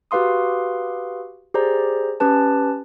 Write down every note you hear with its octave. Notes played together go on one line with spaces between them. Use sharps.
F#4 G4 B4 F5 C6 D#6
G4 G#4 C5 D5 A#5
C#4 G4 B4 A5